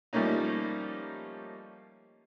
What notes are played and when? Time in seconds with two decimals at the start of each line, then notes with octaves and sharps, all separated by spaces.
0.13 F3 G3 A3 A#3 C#4 D#4